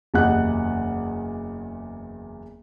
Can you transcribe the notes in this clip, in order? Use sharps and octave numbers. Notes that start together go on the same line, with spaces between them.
F#1 E2 G4 D#5 F#5 F#6